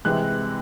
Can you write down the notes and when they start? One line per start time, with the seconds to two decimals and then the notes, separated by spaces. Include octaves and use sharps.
0.05 C3 E3 G#3 F#6